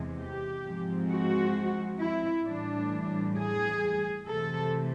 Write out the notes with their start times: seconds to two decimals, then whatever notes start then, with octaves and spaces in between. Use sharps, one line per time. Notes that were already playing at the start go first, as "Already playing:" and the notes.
Already playing: E2 C3 E3 G#3
0.18 G4
0.64 G#2 F3 G#3 C4
1.09 F#4
2.00 E4
2.46 A2 E3 G3 D4
3.37 G#4
4.28 C3 E3 A3 A4